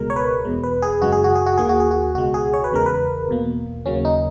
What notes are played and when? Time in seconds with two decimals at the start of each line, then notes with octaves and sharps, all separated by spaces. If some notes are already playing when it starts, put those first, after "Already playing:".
Already playing: C#2 B2 G#3 A#4
0.10 C#5
0.16 B4
0.45 E2 B2 G#3
0.63 B4
0.82 G#4
1.02 F#2 C#3 G#3 F#4
1.12 G#4
1.24 F#4
1.35 G#4
1.46 F#4
1.57 D#2 D#3 A#3 G#4
1.69 F#4
1.80 G#4
1.91 F#4
2.15 C#2 B2 G#3 F#4
2.34 G#4
2.53 C#5
2.64 B4
2.72 E2 C#3 G#3 A#4
2.86 B4
3.29 E2 B2 A#3
3.86 D#2 C#3 F#3 A#3 C#4
4.05 D#4